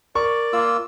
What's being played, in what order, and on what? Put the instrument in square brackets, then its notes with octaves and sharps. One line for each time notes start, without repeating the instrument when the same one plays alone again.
[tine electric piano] A#4 [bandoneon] D5 [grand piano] C#6
[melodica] A#3 F4 E6